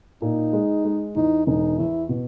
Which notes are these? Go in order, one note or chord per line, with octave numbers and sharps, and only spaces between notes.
A#2 D#4
G#3
G#3
E2 D#4
E1 D#4
E2 E4
B2